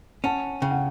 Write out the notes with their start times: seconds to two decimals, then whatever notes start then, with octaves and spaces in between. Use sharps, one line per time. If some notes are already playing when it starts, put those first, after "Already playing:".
0.24 C#4 F#5 A5
0.62 C#3 G5
0.71 F#5